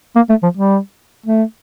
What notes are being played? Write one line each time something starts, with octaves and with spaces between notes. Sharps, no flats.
A#3
A3
F3
G3
A3